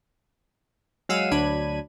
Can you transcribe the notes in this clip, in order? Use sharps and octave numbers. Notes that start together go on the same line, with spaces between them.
F#3 G#3 F5 F#5 E6 D#7
D2 F#3 D4 B5 G#6 D#7